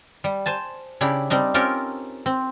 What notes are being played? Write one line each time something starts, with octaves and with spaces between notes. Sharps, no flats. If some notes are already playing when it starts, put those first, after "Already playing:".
G3
C5 G#5 A5
C#3 D4 E4 G4 B5
G3 C4 D4 D#4
C4 C#4 F4 G4 A4 A#4
C4